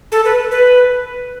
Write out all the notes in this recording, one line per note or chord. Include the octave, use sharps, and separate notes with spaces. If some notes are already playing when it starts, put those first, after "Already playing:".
A4
B4
B4